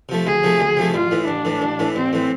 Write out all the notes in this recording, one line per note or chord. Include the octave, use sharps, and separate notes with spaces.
C3 F3 A3
D2 G#4
C3 F3 A3
D2
C3 F3 A3
A1 F4
A2 E3
A1 D4
A2 E3
A1
A2 E3
A1 C4
A2 E3